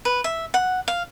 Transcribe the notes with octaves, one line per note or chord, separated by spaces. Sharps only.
B4
E5
F#5
F5